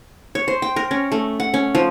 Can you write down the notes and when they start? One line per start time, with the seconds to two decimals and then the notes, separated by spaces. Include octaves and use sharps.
0.35 C#5
0.48 C5
0.62 G5
0.76 A#4
0.91 C#4
1.12 A3
1.40 F#5
1.54 C#4
1.75 F3